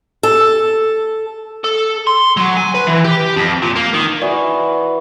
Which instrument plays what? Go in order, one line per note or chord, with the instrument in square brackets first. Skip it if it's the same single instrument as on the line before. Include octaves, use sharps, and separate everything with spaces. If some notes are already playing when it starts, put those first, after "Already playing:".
[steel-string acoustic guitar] A4
[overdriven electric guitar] A4
C6
F#3
G#5
B4
E3
G4
F2
A#2
A#3
D#3
[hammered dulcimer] E3 F#4 [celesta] D5